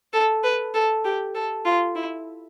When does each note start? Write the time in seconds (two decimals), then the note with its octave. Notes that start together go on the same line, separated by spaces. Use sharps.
0.13 A4
0.43 B4
0.74 A4
1.05 G4
1.35 A4
1.65 F4
1.95 E4